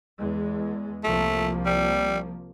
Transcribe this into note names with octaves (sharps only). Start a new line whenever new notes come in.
E2 G#3
C2 F3 A3 A#3
G3